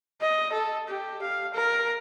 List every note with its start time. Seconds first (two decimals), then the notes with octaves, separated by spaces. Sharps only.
0.22 D#5
0.52 A4
0.88 G4
1.22 F5
1.54 A#4